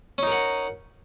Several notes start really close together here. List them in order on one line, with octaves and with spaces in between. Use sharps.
C#4 D#4 A#4 F#5